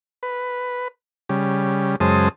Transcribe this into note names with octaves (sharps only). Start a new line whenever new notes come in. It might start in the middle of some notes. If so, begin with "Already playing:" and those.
B4
C#3 G3
F#2 C#3 G#3 C5 A5 D#6